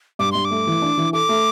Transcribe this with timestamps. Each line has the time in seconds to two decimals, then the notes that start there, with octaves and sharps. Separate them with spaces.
0.19 G2 D6
0.32 G2 C6
0.45 D6
0.51 A3
0.67 E3
0.82 D4
0.98 E3
1.13 A4 D6
1.29 A3